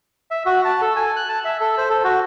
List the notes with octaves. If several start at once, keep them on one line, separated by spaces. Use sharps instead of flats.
E5
F#4
A5
A4
G#5
F#6
A5
E5
A4
C5
A4
F#4